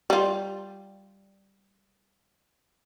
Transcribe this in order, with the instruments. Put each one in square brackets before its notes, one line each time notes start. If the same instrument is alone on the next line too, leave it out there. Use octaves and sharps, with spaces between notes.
[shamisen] G3 F4